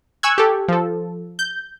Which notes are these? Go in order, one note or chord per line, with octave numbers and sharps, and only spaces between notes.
G#5 C#6 E6 F#6 G#6
G4 A4
F3 A4
G6